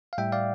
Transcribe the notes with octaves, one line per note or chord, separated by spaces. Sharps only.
F5
A2 G3 E5 G5
D5 F5